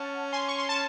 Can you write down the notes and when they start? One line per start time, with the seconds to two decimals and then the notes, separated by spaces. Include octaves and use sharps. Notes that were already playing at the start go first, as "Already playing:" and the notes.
Already playing: C#4 F#5 A5
0.32 G#5 C6
0.48 C#6
0.58 C6
0.69 A5